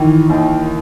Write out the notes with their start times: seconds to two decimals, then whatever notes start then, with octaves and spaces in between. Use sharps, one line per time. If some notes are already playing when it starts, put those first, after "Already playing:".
Already playing: D#3 E3
0.30 D#2